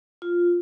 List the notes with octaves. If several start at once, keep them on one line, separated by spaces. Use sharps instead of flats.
F4